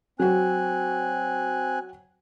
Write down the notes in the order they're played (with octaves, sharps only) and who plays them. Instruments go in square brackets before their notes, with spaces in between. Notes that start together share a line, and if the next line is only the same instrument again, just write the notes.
[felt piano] F#3 F#4 [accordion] C4 G#5 F#6